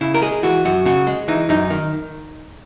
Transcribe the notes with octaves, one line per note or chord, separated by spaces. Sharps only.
C#3 E4
A#4
G#3 G#4
E3 F#4
F#2 F#4
C#3 F#4
G#3
E3 D#4
F#2 D#4
D#3